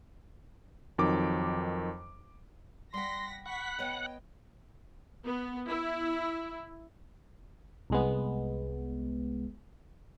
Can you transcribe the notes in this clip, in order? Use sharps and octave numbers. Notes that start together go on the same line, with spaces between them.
F2 D#3 F#3 D6
G3 F#5 G5 C6 A#6 B6
F#5 B5 C#6 B6
B3 C#5 D#5 G5
B3
E4
C2 G#3 B3